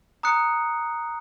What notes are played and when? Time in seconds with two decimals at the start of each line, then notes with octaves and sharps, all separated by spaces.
0.23 A#5 D#6 F#6 C#7